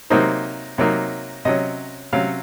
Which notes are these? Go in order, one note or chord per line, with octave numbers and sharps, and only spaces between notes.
C3 F#3 A#3 D#4 C5
C3 F#3 A#3 D#4
C3 F#3 C#4 D#5
C3 F#3 C#4 F5